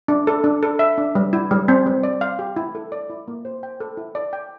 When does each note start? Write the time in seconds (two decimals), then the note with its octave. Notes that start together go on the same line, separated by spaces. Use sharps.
0.08 D4
0.27 A4
0.44 D4
0.63 A4
0.79 E5
0.98 D4
1.15 G3
1.33 E4
1.51 G3
1.68 C4
1.86 G3
2.03 D5
2.21 F5
2.39 G4
2.56 E4
2.75 A4
2.92 D5
3.10 E4
3.28 A#3
3.45 C5
3.63 G5
3.80 A4
3.97 E4
4.15 D5
4.33 G5